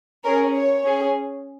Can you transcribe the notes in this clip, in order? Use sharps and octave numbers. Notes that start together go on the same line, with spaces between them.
C#4 G#4 A#4
C#5
C#4 G#4